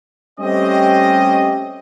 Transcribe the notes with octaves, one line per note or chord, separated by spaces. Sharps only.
G3 A3 C4 C#4 G4 D#5